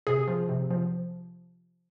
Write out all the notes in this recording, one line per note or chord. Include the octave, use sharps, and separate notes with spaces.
C3 G#4
F3
C3
F3